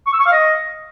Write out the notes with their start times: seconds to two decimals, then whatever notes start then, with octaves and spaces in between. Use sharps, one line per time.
0.07 C#6
0.13 E6
0.20 C#6
0.26 F5
0.32 D#5